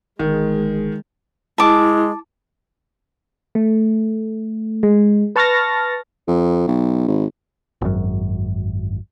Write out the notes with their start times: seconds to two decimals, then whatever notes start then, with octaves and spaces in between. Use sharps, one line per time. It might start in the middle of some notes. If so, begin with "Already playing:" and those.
0.19 G1 D#3 G#3
1.58 G#3 E4 A5 D6
3.55 A3
4.83 G#3
5.36 B4 A5 C#6 F6 A6 A#6
6.28 F2
6.67 B1
7.07 G#1
7.82 G#1 F#2